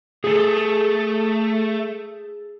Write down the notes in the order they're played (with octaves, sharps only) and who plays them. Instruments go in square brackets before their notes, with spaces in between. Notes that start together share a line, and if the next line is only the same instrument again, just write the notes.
[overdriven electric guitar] A3 [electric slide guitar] G#4 A4